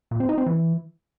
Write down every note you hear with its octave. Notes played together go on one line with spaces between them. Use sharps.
A#2
C4
D#4
C4
E3